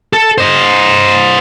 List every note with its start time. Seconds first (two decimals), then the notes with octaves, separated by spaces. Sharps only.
0.13 A4
0.38 C5 D#5